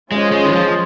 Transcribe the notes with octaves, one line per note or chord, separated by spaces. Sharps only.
G#3 C#4 F4 G#4 C5 D#5
G#3
D#3
F3